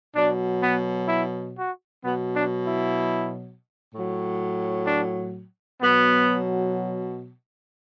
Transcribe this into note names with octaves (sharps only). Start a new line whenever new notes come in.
B2 F#3 D4
B3
E4
F#4
B2 F#3 B3
D4
E4
A2 F#3
D4
B2 F#3 B3